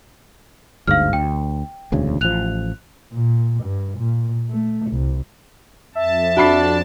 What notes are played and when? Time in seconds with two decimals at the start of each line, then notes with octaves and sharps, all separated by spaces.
0.87 G1 D2 G#2 F5 F6
1.13 D2 G5
1.92 E1 D2 C#3
2.21 A1 F3 F#6 F7
3.12 A#2
3.63 G2
3.98 A#2
4.50 A3
4.91 C2
5.95 F2 E5 A5
6.37 D4 F#4 B5 C7